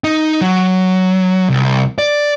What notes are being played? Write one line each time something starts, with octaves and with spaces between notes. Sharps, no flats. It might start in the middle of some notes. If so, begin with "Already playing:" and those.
D#4
F#3
C2
D5